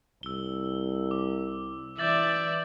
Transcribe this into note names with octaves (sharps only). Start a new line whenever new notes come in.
C2 E6 G7
D6
E3 D5 E5 G6 A6 F#7